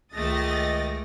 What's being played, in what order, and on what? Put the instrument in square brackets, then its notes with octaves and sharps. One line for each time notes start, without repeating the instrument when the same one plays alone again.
[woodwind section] C#2 D#3 [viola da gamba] G#3 A3 G4 [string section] D#6 A6 A#6